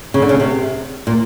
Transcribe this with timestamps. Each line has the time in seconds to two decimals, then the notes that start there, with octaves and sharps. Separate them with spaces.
0.14 C#3
0.22 D3
0.29 C#3
0.40 C3
1.07 A#2